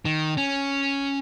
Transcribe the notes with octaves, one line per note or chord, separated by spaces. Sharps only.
D#3
C#4